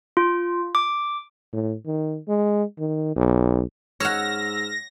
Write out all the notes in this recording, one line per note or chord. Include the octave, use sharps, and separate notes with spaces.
F4
D6
A2
D#3
G#3
D#3
B1
G#2 C#5 F#5 E6 F6 A#6